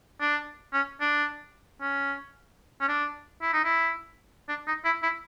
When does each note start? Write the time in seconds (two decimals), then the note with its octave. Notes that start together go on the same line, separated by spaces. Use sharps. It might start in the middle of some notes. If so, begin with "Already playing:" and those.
0.21 D4
0.73 C#4
1.01 D4
1.81 C#4
2.81 C#4
2.88 D4
3.42 E4
3.53 D#4
3.65 E4
4.49 D4
4.67 D#4
4.85 E4
5.03 E4